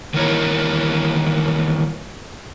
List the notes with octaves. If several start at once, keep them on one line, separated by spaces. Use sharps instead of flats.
D#3 E3 G3 A#3 A#4 C#5